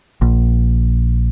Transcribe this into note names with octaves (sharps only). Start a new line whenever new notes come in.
A#1